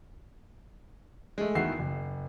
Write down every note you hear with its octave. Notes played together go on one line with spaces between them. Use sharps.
G#3 A3
E2 D#3 E3 F#4 E5 C7
F#1